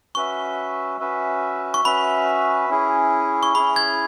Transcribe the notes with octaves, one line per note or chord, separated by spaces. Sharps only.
C#4 F#4 B4 E5 C#6
C#4 F#4 B4 E5
C#6
C#4 F#4 B4 E5 B5
C#4 E4 G#4
C#6
C#4 E4 G#4 B5
G#6